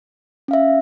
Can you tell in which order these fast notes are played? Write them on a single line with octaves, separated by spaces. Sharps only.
C#4 F5 E5